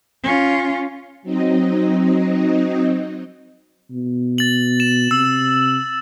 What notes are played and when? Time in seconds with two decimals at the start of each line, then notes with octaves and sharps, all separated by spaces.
0.24 C#4 F4
1.22 F#3 C4 D#4 D#5
3.91 B2
4.38 A6 F#7
4.80 E7
5.11 C3 E6